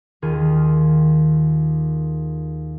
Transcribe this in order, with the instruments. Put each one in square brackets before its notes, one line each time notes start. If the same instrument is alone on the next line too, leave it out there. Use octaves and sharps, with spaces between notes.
[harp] D#2 D#3 F4 G#4